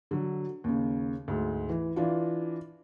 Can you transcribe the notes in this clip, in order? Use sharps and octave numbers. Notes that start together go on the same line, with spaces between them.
D3 F#3
D#2 C#3
D2 G#2
E3
E3 D4 F4